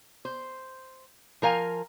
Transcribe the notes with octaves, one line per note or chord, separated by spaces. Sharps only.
C5
F3 A#4 F5 G#5